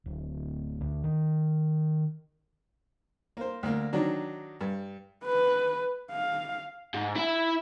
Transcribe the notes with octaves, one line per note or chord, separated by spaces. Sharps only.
D1
D2
D#3
A#3 C5
D2 A#3
D#3 F#3 D4
G2
B4
F5
G#2
E4 E5